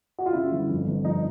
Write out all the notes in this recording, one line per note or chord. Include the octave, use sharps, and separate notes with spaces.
F#4
F4
C#3 E4
G1
F2
G1
F3 D#4